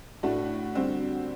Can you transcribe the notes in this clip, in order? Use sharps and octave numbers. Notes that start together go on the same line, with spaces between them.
A2 A3 D4 F#4
D3 G3 C4